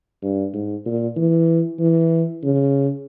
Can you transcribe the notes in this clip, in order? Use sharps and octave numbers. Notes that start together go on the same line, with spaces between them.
G2
G#2
A#2
E3
E3
C#3